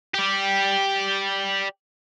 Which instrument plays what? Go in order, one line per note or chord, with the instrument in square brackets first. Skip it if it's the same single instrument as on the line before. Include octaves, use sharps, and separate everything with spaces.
[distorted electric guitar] G4 D5